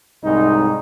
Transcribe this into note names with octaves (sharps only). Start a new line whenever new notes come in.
C2 G#2 D#4